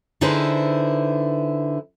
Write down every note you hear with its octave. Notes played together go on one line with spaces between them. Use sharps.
D3 D#4 E4 G#4 B4 C5